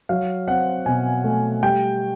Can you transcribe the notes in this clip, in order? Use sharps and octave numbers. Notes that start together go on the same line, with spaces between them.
F#3 F5
C4 F#5
B2 G#5
A3
G3 G5